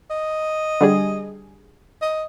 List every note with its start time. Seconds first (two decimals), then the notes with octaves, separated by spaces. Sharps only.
0.11 D#5
0.81 D3 G3 G#4
2.01 D#5